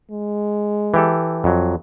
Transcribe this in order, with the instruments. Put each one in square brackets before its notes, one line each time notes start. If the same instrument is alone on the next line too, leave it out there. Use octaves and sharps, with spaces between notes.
[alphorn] G#3
[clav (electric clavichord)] E3 G4 A4
F2 F#3